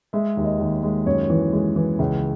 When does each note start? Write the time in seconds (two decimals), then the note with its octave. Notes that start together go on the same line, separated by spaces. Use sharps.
0.13 G#3 E5
0.37 D#2
0.44 D#5
0.60 D#2
0.83 G#3
1.06 F#2 C#5
1.30 E3
1.53 G#3
1.76 E3
1.99 C#2